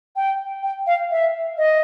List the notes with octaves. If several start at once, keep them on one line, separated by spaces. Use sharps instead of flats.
G5
G5
F5
E5
D#5